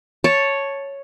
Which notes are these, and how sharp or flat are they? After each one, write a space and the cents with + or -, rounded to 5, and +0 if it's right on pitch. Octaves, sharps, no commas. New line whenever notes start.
C#5 +0 A5 +0